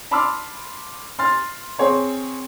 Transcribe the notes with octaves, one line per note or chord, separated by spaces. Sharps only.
A5 B5 C6 D6 E6 F6
C6 F6 A6
C4 G#4 C#5 C6